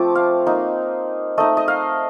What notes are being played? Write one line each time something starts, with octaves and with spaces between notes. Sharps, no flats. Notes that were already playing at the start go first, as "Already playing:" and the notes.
Already playing: F3 A3 C4 D6
F5
A#3 D#4
A3 D#4 D#5
D#5
F5